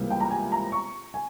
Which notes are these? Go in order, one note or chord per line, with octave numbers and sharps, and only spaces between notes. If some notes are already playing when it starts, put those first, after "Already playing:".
Already playing: C#2 C3 E3 G3 A#3
G5
A#5
G#5
A#5
C#6
G#5